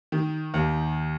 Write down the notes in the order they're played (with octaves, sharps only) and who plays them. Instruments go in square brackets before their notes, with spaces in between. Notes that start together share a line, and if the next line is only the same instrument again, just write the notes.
[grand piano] D#3
D#2